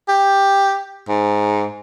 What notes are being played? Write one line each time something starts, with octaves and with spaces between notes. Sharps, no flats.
G4
G#2